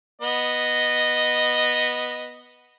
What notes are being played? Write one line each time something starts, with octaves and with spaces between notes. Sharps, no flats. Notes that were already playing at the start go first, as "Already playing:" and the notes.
B3 D#5